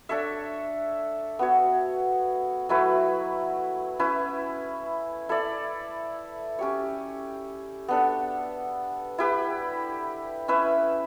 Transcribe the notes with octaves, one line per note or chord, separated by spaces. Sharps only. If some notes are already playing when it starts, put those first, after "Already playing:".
D4 A4 C#5 E5
B3 F#4 C#5
F#3 A3 E4 B4
C#4 E4 B4
E4 A4 D5
C#4 G4 C#5
B3 D4 A4
E4 G4 B4
C#4 E4 B4 E5